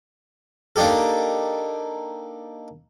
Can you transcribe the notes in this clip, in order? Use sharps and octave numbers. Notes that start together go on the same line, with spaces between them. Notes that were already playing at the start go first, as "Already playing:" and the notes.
A#3 D4 D#4 G4 A4